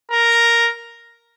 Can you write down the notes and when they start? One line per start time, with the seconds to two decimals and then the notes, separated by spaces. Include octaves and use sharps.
0.11 A#4